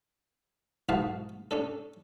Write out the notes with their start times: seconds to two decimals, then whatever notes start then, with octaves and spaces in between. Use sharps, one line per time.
0.89 B1 G#2 E3 F#4 F5 A5
1.51 C#4 D4 A4